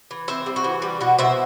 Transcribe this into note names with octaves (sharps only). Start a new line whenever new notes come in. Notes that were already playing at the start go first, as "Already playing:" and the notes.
E3
C4 C5 E5
G3
F#4
E3
G3
B2 F#4
B2 C5 E5